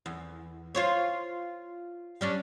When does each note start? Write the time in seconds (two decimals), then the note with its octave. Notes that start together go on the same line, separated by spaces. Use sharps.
0.06 E2
0.75 F4 C5 C#5
2.21 G3 C#4 D4